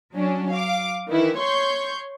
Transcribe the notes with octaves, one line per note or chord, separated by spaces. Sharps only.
F#3 C#4 D4
F5 D6
D#3 E3 E4
C#5 C6 C#6 G6